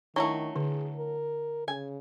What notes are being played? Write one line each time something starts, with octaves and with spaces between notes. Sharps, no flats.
D#3 F#3 G3 A3 D4 E4 C#6
D3 G#4
A#4
C#3 G#5